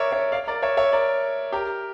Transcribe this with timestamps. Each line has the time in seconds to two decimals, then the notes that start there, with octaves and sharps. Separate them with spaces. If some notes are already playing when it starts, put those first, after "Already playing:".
Already playing: A#4 C#5 D5 E5
0.12 C#5 E5
0.32 D5 F5
0.47 A#4 D5
0.62 C#5 E5
0.77 C#5 E5
0.93 A#4 D5
1.52 G4 A#4